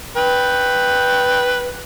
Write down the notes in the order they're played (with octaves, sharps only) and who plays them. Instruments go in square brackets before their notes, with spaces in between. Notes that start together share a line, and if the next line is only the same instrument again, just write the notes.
[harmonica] B4 G5